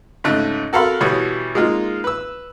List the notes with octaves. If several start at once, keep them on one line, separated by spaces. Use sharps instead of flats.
G#2 C#3 A3 D#5 F#6
F#4 A4 A#4 F5 B5 C6
B2 E3 G3 C#5 D#6
G#3 A#3 D#4 F4
B4 E6